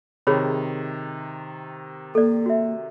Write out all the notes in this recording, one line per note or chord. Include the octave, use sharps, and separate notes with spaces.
C3 D#3 G#4 C#5 B5
A#3 A4 D5
F#4 E5